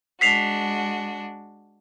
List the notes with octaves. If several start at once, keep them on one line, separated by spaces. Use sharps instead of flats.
G#3 D4 F#4 B6 C7 F7